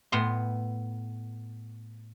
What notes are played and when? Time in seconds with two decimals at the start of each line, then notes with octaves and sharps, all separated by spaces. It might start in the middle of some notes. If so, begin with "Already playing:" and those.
0.12 A2 B3 C6